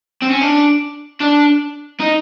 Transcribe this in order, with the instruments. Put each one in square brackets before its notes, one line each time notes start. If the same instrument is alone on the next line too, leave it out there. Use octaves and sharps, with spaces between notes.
[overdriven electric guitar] C4
C#4
D4
D4
D#4